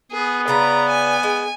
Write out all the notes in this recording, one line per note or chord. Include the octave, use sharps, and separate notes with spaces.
B3 G#4
C#3 D4 B4 A#5
G#5
G#3